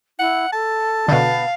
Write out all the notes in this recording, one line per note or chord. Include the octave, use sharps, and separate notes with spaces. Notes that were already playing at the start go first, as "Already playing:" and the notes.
E4 F#5
A4 A5
B2 D3 B3 F5